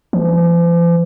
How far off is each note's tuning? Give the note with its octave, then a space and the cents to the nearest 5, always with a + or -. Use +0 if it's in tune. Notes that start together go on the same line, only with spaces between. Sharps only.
F3 -45